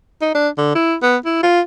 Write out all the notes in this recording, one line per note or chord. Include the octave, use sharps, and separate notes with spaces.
D#4
D4
D3
E4
B3
E4
F4